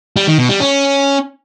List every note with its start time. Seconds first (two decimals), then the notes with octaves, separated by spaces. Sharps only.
0.16 G3
0.27 D#3
0.38 B2
0.49 G3
0.60 C#4